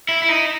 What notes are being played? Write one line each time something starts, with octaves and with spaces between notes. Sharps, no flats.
E4
E4
D#4